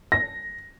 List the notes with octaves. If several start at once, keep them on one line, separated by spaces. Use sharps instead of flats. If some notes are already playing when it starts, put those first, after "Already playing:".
A#6